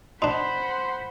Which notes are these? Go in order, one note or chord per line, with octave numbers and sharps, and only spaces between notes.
D4 D#4 C5 F#5 B5 C6